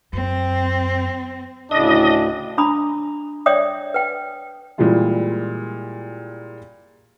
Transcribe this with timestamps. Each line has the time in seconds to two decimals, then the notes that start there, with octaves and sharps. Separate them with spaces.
0.13 F#2 C4
1.71 D2 A2 C#3 D4 D#5
2.58 D4 A#5 B5 D#6
3.46 C#5 D5 E5 G5 D#6
3.94 B4 G5
4.78 A#2 E3 G3 G#3 F4